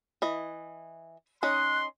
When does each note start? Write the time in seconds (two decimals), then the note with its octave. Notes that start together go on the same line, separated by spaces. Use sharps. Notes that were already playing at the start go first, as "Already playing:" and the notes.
0.22 E3 D#5
1.43 C#4 D#4 D#5 C6 F#6